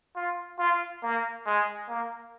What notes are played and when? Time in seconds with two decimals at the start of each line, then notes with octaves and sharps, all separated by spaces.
0.16 F4
0.59 F4
1.03 A#3
1.46 G#3
1.89 A#3